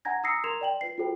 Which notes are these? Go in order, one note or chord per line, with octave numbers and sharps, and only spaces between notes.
F#5 G#5 A#5 G#6 A#6
A#5 D#6 E6 A#6 C7 C#7
A#4 A#5 C6 G#6 E7 F7
D5 G5 F#7
F4 B4 C7
F4 F#4 G#4 A4 C5 G5